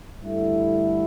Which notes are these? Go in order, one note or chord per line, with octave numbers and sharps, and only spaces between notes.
G2 D3 A3 E4